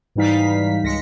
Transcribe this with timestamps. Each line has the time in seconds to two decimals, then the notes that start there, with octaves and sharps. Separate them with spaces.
0.15 G#2 E3 G3 D#4 F5 B6
0.83 C#2 G#3 A#6 B6 C#7